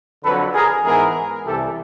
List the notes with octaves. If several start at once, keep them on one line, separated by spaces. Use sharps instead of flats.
F2 D3 F#3 A4 B4
G#4 A#4
G#2 E3 G#3 B3 G#4 A#4
C2 C3 E3 G4 A4